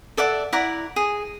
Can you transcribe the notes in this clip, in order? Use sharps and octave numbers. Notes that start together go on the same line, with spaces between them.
A4 D5 E5 F#5
E4 D5 F#5 A#5
G#4